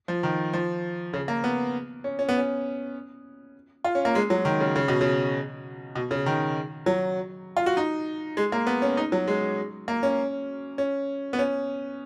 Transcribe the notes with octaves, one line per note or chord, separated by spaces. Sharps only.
F3
D#3
F3
C#3
A#3
B3
C#4
C#4
B3
C#4
F4
C#4
A#3
G#3
F#3
D#3
C#3
C#3
B2
C#3
B2
C#3
D#3
F#3
F4
F#4
D#4
G#3
A#3
B3
C#4
D#4
F#3
G#3
A#3
C#4
C#4
B3
C#4